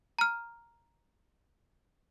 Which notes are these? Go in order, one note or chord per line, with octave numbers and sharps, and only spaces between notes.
A#5 F6